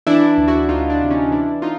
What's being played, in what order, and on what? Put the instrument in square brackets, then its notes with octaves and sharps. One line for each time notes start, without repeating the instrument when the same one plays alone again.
[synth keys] E3 D4 E4
D2
E4 F#4
D2 D#4 F4
D4 E4
C3
C#4 D#4
E3 D4 E4
D#4 F4